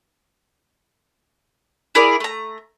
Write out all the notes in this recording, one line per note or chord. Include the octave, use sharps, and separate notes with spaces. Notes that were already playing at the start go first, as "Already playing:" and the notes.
E4 G#4 A#4 D5
A3 A#5